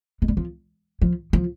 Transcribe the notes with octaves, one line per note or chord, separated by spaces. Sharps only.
G#3
G3
F3
F3
F3